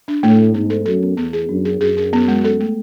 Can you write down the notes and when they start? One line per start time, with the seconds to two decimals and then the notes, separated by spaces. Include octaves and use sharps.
0.08 D4
0.23 A2 A3
0.39 A3
0.54 G#2 B3
0.70 A4
0.86 F#2 A4
1.02 B3
1.17 E2 B3
1.33 G#4
1.49 F#2 D4
1.65 G#4
1.81 F#2 G#4
1.97 G#4
2.13 B3
2.28 G#3
2.44 A4
2.60 A3